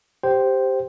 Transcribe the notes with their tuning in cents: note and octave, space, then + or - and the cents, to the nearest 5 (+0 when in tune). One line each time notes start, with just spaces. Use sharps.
G4 +0 C5 +0 G5 -15